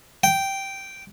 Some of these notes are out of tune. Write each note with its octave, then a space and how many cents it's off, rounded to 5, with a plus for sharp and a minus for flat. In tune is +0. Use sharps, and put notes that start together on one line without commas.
G5 -5